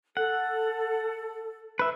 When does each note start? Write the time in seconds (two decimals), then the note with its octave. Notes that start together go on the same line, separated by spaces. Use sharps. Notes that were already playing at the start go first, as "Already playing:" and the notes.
0.17 A4 F#5
1.79 B4 E5